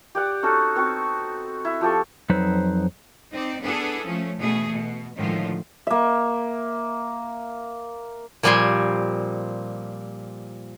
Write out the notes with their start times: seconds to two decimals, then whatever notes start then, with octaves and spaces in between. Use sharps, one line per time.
0.15 G4 D5 F#5
0.42 C#4 D#4 F#4 A4
0.76 B3 C4 F#4 C#6
1.65 E4
1.81 F3 G4 A4 C#6
2.30 F2 F#3 D#4 B4 C5
3.31 C4 D#4 D5
3.61 B3 D4 E4 G#4 A4
4.06 F3 A3 C#4
4.38 B2 E3 A3 G#4
4.71 B2
5.15 A2 D3 D#3 F3 G#3 F4
5.87 A#3 E5
8.43 A#2 F3 G3 C4 G#5 C6